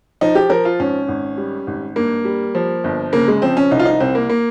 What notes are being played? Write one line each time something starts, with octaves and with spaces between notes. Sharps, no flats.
F3 D#4
G4
F3 A#4
F4
G#1 C#4
G#1
G3
G#1
G2 A#3
G3
F3
G1
C#3 A#3
G#3
F3 C4
C#4
C2 D#4
F4
D#4
C2 C4
A#3
A#3